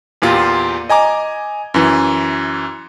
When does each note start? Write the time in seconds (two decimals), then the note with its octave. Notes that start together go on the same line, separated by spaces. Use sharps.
0.22 E2 A#2 F4 G4
0.89 D#5 G#5 A#5 D6
1.74 F#2 E3